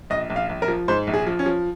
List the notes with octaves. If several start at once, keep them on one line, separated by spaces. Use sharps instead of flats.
A#1 D#5
A#1
F5
A#1
A#4
F3
G#2 C5
A#1
G#4
F3
C#4
F3